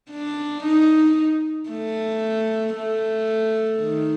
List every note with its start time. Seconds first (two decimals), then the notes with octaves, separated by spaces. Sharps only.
0.10 D4
0.63 D#4
1.69 A3
2.76 A3
3.82 D#3